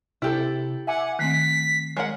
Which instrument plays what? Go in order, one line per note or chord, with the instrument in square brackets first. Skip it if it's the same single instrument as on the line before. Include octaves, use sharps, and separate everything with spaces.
[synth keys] C3 [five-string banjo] E4 G4 A4
[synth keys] E5 G#5 D6 [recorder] F#5
[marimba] D#3 A3 C4 [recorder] B6 [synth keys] C7
[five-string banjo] G#3 A#4 F#5 [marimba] C#5